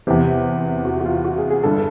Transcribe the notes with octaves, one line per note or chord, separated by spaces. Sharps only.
E2 C3 E3 G4
F#4
F#4
F4
F#4
G#4
G#4
G2 D3 A4